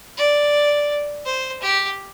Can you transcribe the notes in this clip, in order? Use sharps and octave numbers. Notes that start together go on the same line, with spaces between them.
D5
C5
G4